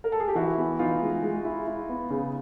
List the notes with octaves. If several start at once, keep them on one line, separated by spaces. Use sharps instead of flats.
A#4
A4
G#4
G4
E3 E4 F#4
B3
E3 D#4 F4
G#3
G#3
E4
E4
B3
C#3